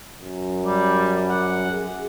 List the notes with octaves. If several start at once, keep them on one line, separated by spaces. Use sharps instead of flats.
F#2
G3
F#5
G#4